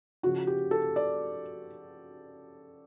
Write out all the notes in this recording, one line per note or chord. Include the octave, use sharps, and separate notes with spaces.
C#3 F3 F#4
G4
A4
D5